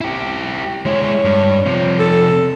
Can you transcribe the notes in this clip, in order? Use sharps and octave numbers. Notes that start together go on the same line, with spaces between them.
E4 G4
G#3 E4 C#5
G2
C3 F3
A4